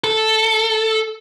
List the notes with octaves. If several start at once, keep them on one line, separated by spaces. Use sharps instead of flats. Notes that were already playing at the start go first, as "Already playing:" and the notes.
A4